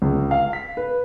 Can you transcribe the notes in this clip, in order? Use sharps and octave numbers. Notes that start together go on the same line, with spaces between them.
C#2
F5
B6
B4